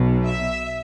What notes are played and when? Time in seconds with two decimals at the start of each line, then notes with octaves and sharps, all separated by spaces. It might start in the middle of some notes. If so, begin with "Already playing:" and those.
Already playing: B1 B2
0.25 E5